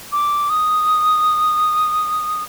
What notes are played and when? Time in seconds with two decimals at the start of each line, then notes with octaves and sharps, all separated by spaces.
0.12 D6
0.50 D#6